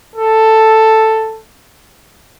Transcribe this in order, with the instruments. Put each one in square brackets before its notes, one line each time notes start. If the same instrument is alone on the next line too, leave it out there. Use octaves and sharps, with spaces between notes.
[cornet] A4